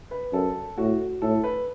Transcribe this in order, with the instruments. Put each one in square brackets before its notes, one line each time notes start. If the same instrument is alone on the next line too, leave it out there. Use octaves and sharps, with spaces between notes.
[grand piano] B4
[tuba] F#2 [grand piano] A4
[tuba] A2 [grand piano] F#4
[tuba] A2 [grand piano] A4
[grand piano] B4